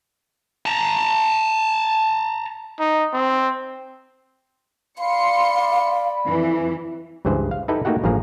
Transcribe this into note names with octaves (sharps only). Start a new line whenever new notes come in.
A5 A#5
D#4
C4
D5 F5 B5 C6 C#7
F2 E3
C#2 G2 E3 G#4 C5
F5
D#4 E4 G4 A4 B4 G5
A3 A#3 D#4 F#4 G4 F#5
A1 G2 F3 A#3 G#4 A#5